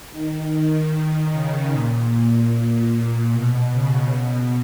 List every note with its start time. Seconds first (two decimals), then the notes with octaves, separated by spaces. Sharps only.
0.12 D#3
0.52 D#3
1.32 C#3
1.72 A#2
2.11 A#2
3.31 B2
3.72 C#3
4.11 B2